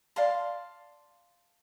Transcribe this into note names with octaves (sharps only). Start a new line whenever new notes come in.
D5 F5 A5 C6